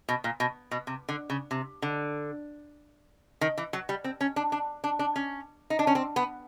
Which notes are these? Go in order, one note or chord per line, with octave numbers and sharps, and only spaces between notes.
B2
A#2
B2
B2
C3
D3
C#3
C3
D3
D#3
E3
F#3
G3
C4
C#4
D4
D4
D4
D4
C#4
D#4
D4
C#4
C4
B3